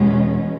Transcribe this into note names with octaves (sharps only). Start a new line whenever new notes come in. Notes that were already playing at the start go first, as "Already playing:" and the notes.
Already playing: E2 B2 G#3 C#4